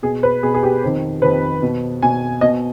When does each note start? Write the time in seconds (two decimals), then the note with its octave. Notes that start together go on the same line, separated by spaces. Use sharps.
0.03 B2 G#4
0.23 B4
0.43 B2 G#4
0.54 G#4
0.63 G4
0.83 F2 D#3
1.22 F2 D#3 B4
1.62 B2
2.02 B2 G#5
2.41 B2 D#5